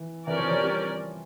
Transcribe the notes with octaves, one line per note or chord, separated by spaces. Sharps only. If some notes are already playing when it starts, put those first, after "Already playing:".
Already playing: E3
E3 C#4 G4 A#4 D5
F3
F3
G3